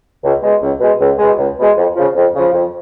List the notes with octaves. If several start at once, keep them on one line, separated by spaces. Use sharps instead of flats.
C#2
B2 G#3
C#2
B2 G#3
C#2
B2 G#3
C#2
B2 G#3
F2
C#3 F3
F2
C#3 F3
F2